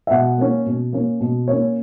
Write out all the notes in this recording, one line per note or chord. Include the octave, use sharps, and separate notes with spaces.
E5
B2 F#5
A#3 C#4
B2
A#3 C#4
B2
A#3 C#4 C#5